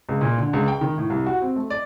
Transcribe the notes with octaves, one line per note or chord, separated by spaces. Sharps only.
C#2
A#2
D3
C#2
G5
D#3
A2
C2
F#4
C4
A3
D5